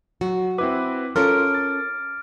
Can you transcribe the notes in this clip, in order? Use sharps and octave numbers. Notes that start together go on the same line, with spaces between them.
F#3 F#4
C4 E4 B4 D6
C#4 F4 A4 A#4 F6 D7
A6